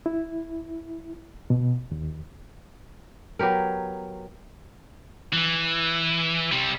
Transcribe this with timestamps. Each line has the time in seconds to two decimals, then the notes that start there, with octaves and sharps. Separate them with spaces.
0.06 E4
1.50 B2
1.92 D#2
3.39 F#3 B3 G4 A#4
5.33 E3
6.51 C3 G3